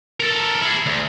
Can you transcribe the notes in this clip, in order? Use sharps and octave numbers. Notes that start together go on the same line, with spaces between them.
A4 A#4
E4 G#4
D2